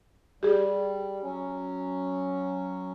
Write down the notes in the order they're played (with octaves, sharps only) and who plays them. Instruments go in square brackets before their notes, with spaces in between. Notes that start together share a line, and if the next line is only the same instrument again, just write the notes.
[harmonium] G3 [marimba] G4 G#4
[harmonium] F#3 C#4